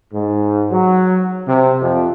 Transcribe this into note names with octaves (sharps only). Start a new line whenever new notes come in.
G#2
F#3
C3
F2